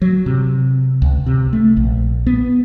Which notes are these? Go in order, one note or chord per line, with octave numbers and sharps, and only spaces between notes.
F#3
C3
C#2
C3
A3
A#1
B3